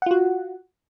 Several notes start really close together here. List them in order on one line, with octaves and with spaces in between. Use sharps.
F#5 F4 F#4